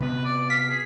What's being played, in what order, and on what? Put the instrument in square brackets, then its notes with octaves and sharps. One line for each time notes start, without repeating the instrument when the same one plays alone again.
[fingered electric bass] C3 B3 [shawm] B4
[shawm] D5
[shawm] F5 [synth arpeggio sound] B6
[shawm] G#4